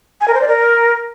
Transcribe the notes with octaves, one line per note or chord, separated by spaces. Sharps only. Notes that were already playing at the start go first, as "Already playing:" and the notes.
G#5
A#4
C5
D5
A#4